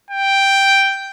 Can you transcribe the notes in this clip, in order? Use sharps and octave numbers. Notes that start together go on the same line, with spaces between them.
G5